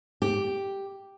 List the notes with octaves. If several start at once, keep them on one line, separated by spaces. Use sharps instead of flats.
G4